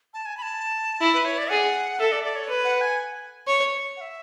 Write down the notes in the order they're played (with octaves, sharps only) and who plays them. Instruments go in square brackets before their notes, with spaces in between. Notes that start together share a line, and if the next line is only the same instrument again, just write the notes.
[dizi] A5
G#5
B5
A5
[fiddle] E4
[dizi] B4
C#5
D5
[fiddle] G#4 [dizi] F#5
[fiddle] A4 [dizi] E5
[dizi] D5
D5
C#5
[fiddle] B4
[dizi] F#5
G#5
[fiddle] C#5
[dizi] F#5
E5